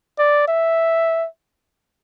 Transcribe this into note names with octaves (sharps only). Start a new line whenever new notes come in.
D5
E5